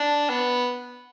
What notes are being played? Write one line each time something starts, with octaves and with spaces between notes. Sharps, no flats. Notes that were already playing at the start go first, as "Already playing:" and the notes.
Already playing: D4
B3